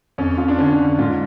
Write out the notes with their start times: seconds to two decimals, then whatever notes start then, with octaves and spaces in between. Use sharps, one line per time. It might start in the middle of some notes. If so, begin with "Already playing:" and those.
0.18 F2 C#4
0.37 F2 F4
0.48 D4
0.59 D3 C#4
0.79 D3
0.98 G#2 F4